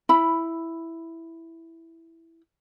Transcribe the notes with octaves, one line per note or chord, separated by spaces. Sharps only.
E4 B5